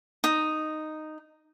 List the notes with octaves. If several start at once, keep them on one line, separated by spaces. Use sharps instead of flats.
D#4